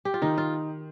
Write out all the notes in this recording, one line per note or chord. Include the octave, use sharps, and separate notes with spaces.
G4
F4
D#3 D#4
F4